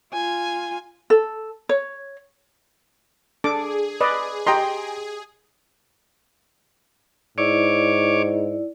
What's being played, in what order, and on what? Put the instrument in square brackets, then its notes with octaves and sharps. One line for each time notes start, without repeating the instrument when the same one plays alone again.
[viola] F4 G#5
[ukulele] A4
C#5
[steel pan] D4 A4 D6 [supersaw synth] G#4
[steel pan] B4 D5 D#5
[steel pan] G4 D#5 [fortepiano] G5 A#5 C6
[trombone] G#2 [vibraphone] E4 D5 [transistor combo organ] C#5 D6